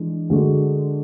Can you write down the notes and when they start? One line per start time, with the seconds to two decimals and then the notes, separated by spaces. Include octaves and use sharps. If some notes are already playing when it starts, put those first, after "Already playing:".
Already playing: E3 G#3 D4
0.30 D3 G#3 D4 F#4